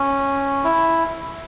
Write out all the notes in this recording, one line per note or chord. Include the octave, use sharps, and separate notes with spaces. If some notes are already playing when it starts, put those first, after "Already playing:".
Already playing: C#4
E4